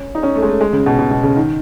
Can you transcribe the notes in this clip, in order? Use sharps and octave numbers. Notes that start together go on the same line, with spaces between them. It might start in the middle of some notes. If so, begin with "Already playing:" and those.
Already playing: C#4
D#4
C#4
A3
G#3
A3
G#3
C#3
B2
B2
B2
C#3
D#3